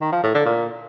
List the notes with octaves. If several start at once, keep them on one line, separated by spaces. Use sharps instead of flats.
D#3
F3
A2
D3
A#2